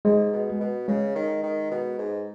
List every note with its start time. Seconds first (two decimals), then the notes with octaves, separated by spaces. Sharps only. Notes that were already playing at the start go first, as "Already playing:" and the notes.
0.05 G#2 G#3
0.33 B2
0.60 B2
0.88 C#3 G#3
1.16 D#3
1.43 D#3
1.71 B2
1.99 G#2